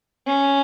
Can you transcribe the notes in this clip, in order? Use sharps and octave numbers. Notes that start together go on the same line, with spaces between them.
C#4